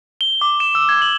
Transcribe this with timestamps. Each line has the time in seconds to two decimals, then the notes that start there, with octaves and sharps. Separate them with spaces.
0.21 G7
0.41 D6
0.60 E7
0.75 E6
0.89 G#6
1.02 F#7